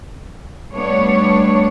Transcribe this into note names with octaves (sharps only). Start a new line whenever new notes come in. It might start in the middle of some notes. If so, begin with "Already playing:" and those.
G3 A3 B3 D4 C#5